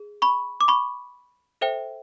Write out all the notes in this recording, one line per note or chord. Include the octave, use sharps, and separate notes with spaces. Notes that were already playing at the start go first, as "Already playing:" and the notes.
Already playing: G#4
B5 C#6
D6
B5 C#6
A4 C5 E5 G5